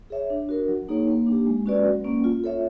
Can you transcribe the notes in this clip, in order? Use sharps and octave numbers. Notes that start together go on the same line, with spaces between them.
G#4 C#5 E5
D4
F#4 A#4
F#3
A#3 D#4 G#4 C#5
A#3
D4
G4
G#3
C#4 F#4 B4 D5
F#3
A#3 C#4
F4
A4 C#5 E5